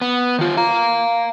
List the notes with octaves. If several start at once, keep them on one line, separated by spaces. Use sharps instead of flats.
B3
D#3 F4
F5 A#5